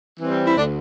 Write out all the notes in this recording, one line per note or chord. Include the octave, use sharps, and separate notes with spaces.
E3 G3 C4
E4
D2 D4